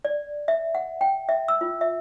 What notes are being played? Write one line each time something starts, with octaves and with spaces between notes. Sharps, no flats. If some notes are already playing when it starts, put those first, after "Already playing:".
D5
E5
F#5
G5
E5
E6
F4
E5